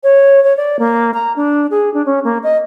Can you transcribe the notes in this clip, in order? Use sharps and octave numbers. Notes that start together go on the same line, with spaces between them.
C#5
C#5
D5
A#3
A#5
D4
G#4
D4
C#4
A#3
D#5